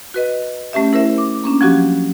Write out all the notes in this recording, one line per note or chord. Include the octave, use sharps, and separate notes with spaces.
F#4 B4 D#5
A3 C#4 G4 E5
E4 A#4 C5 E5
D6
A#3 C#4 D4
F3 F#3 C4 C#4 F#4 G4